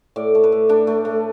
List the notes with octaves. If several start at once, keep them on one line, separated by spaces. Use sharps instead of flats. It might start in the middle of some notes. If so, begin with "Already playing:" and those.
A2 D5
A3
B4
A3
A3 D4
A3
A3